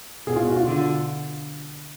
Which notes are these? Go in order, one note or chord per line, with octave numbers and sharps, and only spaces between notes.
B2 G#4
F4
F#4
F4
D3